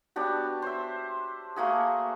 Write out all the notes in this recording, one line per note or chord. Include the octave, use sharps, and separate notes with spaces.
B3 D4 F#4 G4
C5 E5
A3 A#3 F#4 G#4